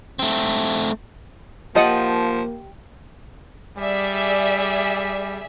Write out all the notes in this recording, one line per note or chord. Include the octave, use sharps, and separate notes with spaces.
A3 C4
F3 A#3 G4 D#5 F#5 G5 A5
G3 G#4 D5 E5